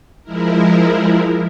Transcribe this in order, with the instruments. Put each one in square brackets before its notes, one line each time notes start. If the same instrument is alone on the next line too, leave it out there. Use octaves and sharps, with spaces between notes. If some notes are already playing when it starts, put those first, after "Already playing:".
[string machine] F3 G#3 E4 A#4